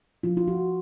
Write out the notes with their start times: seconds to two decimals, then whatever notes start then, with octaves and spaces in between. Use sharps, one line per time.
0.23 F3 F4
0.37 F4
0.48 F3 F#4